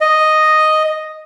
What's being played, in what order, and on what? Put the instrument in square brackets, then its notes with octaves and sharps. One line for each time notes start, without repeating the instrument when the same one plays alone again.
[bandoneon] D#5